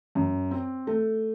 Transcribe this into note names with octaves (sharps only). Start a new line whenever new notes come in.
F#2
C4
A3